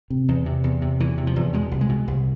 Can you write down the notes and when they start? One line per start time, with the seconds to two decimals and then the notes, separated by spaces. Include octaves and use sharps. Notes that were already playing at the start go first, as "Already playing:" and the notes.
0.10 C3
0.28 E2
0.46 C3
0.64 E2
0.82 C3
1.00 E2 E3
1.18 C3
1.27 F3
1.36 E2
1.53 B2 G#3
1.71 C2
1.81 G#3
1.89 B2
2.08 C2